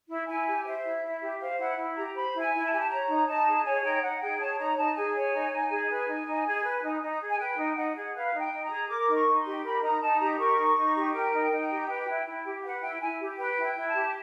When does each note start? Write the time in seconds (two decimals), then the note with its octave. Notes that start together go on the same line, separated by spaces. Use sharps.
0.09 E4
0.27 E4 G#5
0.47 G4
0.65 C5 E5
0.83 E4
1.03 E4
1.22 G4
1.40 C5 F5
1.58 E4 F#5
1.77 E4
1.96 G4 A#5
2.15 C5 B5
2.34 E4
2.40 G#5
2.53 E4
2.65 A5
2.71 G4 G#5
2.80 A5
2.90 C#5 A#5
3.08 D#4
3.27 D#4 A5
3.46 G#4
3.64 C#5 G#5
3.83 D#4 G5
4.02 D#4 F#5
4.20 G#4 G5
4.40 C#5 A5
4.58 D#4 A#5
4.77 D#4 A5
4.96 G#4 G#5
5.15 C#5
5.33 D#4
5.51 D#4
5.70 G#4
5.89 B4 G#5
6.08 D#4
6.27 D#4
6.45 G#4
6.64 B4
6.83 D#4
7.01 D#4
7.21 G#4
7.29 G#5
7.39 B4 G5
7.58 D#4
7.76 D#4 F#5
7.95 G#4
8.14 B4 F5
8.33 D#4
8.39 G5
8.52 D#4
8.64 A#5
8.71 G#4
8.89 A#4 D6
9.08 D#4
9.14 C#6
9.27 D#4
9.39 C6
9.45 G4
9.63 A#4 B5
9.82 D#4 A#5
10.02 D#4 A5
10.20 G4 A#5
10.38 A#4 C#6
10.57 D#4
10.76 D#4
10.95 G4
11.14 A#4 G5
11.33 D#4
11.51 D#4
11.70 G4
11.89 B4
12.07 E4
12.26 E4
12.45 G4
12.64 B4 F#5
12.82 E4 G5
13.01 E4 G#5
13.20 G4
13.38 B4 G5
13.58 E4
13.63 G5
13.76 E4
13.88 A5
13.94 G4